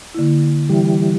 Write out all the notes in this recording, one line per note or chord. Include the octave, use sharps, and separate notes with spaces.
D3 A#3 E4
E3 G3